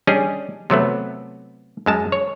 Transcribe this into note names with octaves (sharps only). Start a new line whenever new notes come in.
G3 C#4 D4 G#4 D#5
C3 F#3 A3 B3
F#2 G#3 A5
C#5